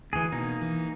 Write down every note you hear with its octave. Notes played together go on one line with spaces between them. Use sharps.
D2 E3 G#4
B2 A#3 D#4
E3